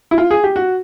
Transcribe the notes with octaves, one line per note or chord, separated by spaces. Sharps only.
E4
F4
G#4
G4
F#4